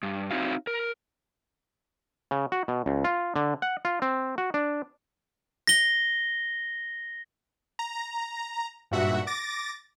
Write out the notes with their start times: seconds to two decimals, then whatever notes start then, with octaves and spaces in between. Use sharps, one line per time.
0.03 G2
0.31 C4 D#4 E4 F#4 F5
0.67 A#4
2.31 C#3
2.52 F#4
2.68 B2
2.86 C#2
3.04 F4
3.36 D3
3.62 F#5
3.85 F4
4.02 C4
4.38 F#4
4.54 D4
5.67 A#6 G7
7.79 A#5
8.91 G#1 G2 A#2 F#4 E5 F#5
9.27 D6 A6 A#6